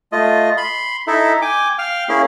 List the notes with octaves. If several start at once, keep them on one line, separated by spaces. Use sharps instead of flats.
A3 F4 D#5
B5 C6
D#4 E4 A4 E5
G5 G#5 D6
F5 G5 F6
A#3 C#4 E4 G#4